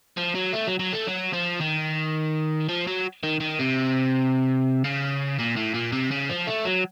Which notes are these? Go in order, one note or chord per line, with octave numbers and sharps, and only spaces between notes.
F3
F#3
A3
F#3
F#3
A3
F#3
F3
D#3
F3
F#3
D#3
D#3
C3
C#3
A#2
A2
A#2
C3
C#3
F3
A3
F#3